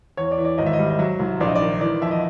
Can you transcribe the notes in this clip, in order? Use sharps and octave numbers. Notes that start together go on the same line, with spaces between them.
E2 C#5
D5
E3
D5
G#1 D#5
E5
D#5
G3
D#5
F#3 E5
C2
A#1 D5
D#5
D5
D#3
E3 D5
F2 E5
D#5